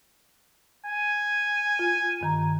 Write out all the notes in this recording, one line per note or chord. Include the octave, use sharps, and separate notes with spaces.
G#5
F4
G2 D#3 A#5